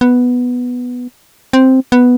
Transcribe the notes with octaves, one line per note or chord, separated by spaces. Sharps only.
B3
C4
B3